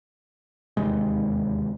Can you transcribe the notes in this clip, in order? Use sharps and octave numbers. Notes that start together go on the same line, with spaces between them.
E1 D#2 C3 G#3